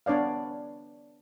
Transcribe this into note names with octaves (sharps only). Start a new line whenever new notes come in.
B3 D4 C#5 D5 F5